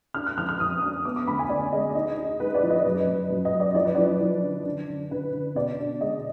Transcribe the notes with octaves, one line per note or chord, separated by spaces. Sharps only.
D4 F6
F#6
F2 F6
F6
F2 D#6
D4 D#6
B3 D6
D6
D2 B5
G#5
D3 D5
G#3 D#5
D#4 D#5
D#4
G#3 B4
D5
F3
D#5
F#2 B4
F#2
F#2
D#5
F#2
D5
F3 D5
B4
F3 D5
F3
D3
D3
D3
D3 B4
D3
B2 D5
D4
G#3 D#5